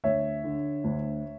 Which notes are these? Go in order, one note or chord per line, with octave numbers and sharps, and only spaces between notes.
D2 C#5 E5
D3
D2